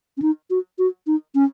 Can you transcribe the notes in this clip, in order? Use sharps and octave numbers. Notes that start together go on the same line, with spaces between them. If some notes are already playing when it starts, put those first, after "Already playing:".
C#4
D#4
F#4
F#4
D#4
C#4